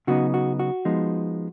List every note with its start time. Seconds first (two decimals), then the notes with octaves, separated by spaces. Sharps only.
0.07 C#3 F#3 B3 D#4 F#4
0.34 F#4
0.59 F#4
0.85 F3 G#3 B3 D#4